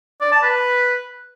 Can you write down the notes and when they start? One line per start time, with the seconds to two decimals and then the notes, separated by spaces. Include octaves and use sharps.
0.21 D5
0.32 A5
0.43 B4